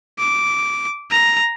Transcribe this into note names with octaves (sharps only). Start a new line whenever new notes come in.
D6
A#5